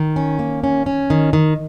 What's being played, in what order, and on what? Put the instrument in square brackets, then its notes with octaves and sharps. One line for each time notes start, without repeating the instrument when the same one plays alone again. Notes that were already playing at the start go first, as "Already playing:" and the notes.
Already playing: [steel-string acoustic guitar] D#3
C#4
A#3
C#4
C#4
D#3
D#3